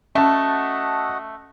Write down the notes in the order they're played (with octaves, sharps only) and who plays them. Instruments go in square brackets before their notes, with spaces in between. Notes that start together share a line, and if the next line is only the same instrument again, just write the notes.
[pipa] A3 [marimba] C#4 [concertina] F#4 D#5 F#5 [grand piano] E5 A5